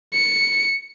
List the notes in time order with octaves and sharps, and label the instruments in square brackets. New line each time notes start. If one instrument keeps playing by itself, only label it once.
[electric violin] C#7